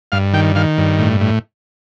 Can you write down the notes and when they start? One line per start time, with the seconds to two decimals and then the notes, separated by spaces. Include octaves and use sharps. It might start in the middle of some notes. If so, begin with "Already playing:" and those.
0.12 G2 F5
0.33 D#3 G5
0.56 D#3 F5
0.78 G2
0.99 A2
1.20 A2